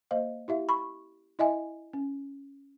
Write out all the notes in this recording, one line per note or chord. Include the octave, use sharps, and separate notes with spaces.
A#3 C5 D#5 F5
E4 G4 E5 F5
B5 C#6
E4 D#5 E5 G#5
C#4